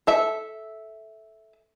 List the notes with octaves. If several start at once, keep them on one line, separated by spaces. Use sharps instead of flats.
A4 E5